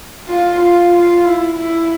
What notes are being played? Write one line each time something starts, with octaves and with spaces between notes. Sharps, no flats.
F4
F4
F4
E4
E4